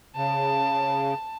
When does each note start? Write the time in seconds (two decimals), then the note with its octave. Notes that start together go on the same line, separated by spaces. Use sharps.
0.16 C#3 A5